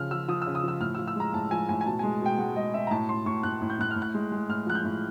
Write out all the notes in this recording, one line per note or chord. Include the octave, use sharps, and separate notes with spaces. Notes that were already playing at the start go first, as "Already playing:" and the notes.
Already playing: C#3 F3 F6
F3 E6
F3 D#6
E6
C#3
D#6
F3 E6
A2 F6
F3 E6
E6
G#3 A#5
A2 A5
F3 G#5
A2 G#5
G#5
B2 A5
G#3 G#5
B2 G5
G#3 F#5
G#3 D#5
B2 E5
A#5
A2 A5
A2 C6
A2 C#6
A2 F#6
A2
G6
A2 F#6
F6
A2
F#6
G#3
G#3
A2 F6
F3 F#6
G6
A2